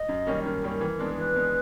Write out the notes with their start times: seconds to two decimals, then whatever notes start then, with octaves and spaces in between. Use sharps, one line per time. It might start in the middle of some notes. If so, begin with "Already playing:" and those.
Already playing: D#5
0.08 F#2
0.27 D#3 G3 A#3 C#4
0.45 F#2 A#4
0.63 D#3 G3 A#3 C#4
0.81 E3
0.99 G#3 B3 D4
1.18 E3 B4
1.36 G#3 B3 D4